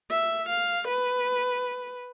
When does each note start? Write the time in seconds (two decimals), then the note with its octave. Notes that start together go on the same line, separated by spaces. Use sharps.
0.11 E5
0.49 F5
0.88 B4